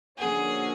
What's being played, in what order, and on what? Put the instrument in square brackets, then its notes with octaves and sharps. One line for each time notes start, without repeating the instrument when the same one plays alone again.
[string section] D3 F3 A#3 C#4 F#4 [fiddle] G#4